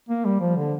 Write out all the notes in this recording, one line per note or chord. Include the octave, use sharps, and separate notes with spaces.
A#3
G3
F3
D3